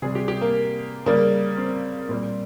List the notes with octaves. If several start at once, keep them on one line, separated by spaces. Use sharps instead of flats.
C3 G3 G#4
G4
G4
A#3
C#3 G3 A#3
C4
A#2 G3